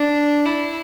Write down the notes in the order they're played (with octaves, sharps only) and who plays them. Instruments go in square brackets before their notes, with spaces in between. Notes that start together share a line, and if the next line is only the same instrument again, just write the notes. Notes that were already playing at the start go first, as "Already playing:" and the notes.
Already playing: [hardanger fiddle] D4
E4